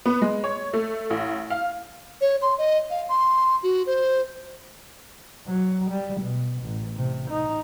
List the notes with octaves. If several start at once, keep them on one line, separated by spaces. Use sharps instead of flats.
B3
G#3
C#5
A3
A1
F5
C#5
C6
D#5
F5
C6
F#4
C5
F#3
G3
B2
A1
C3
D#4